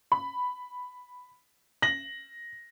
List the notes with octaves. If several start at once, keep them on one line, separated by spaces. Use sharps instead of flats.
B5
A#6 F#7